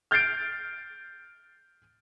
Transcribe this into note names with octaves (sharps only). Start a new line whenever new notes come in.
F6 G6 A6 C7 D7